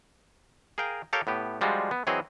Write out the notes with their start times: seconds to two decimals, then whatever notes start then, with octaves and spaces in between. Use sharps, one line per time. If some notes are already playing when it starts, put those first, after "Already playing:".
0.78 G#4 A#4 F5 G5 G#5 A#5
1.13 G4 A4 A#4 C#5 F5 G5
1.27 A2 B3 G4
1.61 F3 G3 G#3 D4 F4 F#4
1.91 B3
2.07 E3 F#3 C4 G#4 C#5 D#5